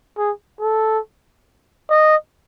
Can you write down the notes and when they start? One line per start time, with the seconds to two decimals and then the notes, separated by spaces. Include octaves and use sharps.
0.18 G#4
0.60 A4
1.90 D#5